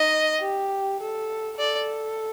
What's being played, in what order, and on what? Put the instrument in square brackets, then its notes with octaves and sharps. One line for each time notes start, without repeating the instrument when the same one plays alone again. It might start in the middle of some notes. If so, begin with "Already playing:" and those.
Already playing: [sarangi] D#4 [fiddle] D#5
[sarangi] G4
A4
[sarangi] A4 [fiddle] D5